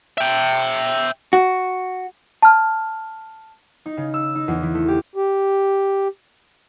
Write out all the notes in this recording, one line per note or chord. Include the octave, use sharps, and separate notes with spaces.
E5 G5
F#4
A5 F6
D#4
C#3
E6
D#4
E2
E3
A3
G4
G4